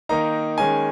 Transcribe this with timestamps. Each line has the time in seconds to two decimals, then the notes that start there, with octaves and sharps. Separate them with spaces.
0.09 D#3 A#3 D#4 A#5
0.58 D#3 G#3 C#4 G#5